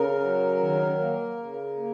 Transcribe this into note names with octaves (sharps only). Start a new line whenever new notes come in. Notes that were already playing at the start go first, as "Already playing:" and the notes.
Already playing: C#3 A#4
F#3
D#3
A#3
C#3
A#3